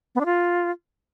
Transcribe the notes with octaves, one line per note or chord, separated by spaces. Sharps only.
B3
D4
F4